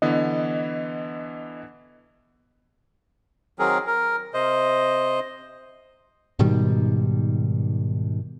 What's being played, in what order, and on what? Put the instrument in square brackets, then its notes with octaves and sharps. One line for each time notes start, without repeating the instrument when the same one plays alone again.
[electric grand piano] D3 E3 B3 [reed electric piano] D#5
[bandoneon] D#3 F#3 C4 G#4 A#4
A#4
C3 C5 D#5
[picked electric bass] G#2 B2 D#3 G3